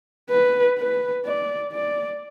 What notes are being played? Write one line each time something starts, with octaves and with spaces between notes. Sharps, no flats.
B4
B4
D5
D5